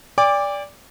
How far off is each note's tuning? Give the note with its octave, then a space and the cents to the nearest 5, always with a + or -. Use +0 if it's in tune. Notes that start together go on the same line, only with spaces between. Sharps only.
D5 -15 G5 +45 D6 +0